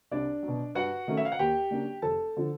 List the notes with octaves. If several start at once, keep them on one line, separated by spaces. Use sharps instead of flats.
C2 D4 D5
F#3
B2
G2 F#4 F#5
D#3 F#3 A3 C#4
E5
F5
F#5
D#2 G4 G5
C#3 F#3 A#3 D4
F1 A4 A5
D3 F3